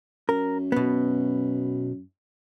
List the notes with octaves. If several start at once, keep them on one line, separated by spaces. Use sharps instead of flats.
F#2 A#4
B2 B3